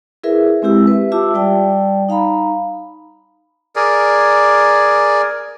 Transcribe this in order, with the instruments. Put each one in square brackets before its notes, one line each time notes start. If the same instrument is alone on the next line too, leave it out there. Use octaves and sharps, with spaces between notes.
[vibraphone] E4 G#4 A#4 B4 E5
G#3 C4 E4 G4 E6
B4 E5
F4 G4 E5 A5 D6 E6
G3 D5 G5 A5
D#4 F5 A#5 B5
[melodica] G#4 A#4 D5